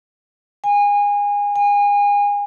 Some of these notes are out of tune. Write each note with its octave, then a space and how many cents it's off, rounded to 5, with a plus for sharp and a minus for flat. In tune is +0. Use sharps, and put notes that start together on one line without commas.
G#5 -25
G#5 -30